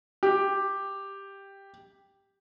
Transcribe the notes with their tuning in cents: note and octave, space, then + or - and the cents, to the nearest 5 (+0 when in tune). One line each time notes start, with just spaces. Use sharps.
G4 +5